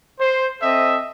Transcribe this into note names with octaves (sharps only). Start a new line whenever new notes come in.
C5
C4 A4 D#5 E5